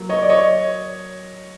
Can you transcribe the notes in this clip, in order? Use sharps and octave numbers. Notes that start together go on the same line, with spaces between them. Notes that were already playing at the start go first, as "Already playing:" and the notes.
Already playing: F#3 A#3
C#5 D#5
D5
C#5 D#5